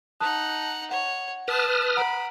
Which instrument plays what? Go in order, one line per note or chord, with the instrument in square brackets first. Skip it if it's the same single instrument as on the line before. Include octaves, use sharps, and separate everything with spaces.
[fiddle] D#4 F#5 [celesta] A5 D#6 F#6
[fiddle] C#5 [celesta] F#5
[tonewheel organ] B4 D#6 F6 [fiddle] A5
[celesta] F#5 A#5 D7 [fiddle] B5